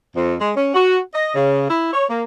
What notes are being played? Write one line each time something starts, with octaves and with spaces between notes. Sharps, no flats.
F2
G#3
C#4
F#4
D#5
C#3
E4
C#5
A#3